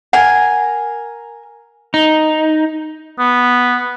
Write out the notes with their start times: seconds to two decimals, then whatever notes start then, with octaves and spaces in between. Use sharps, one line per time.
0.13 A#4 F#5 G#5
1.94 D#4
3.19 B3